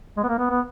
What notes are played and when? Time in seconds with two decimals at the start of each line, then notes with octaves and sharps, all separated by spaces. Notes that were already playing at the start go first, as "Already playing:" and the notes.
0.17 G#3
0.24 B3
0.29 A#3
0.38 B3
0.50 B3